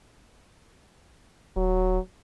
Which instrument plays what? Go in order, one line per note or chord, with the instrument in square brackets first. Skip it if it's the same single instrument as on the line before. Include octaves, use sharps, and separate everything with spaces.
[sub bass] D#1 [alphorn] F#3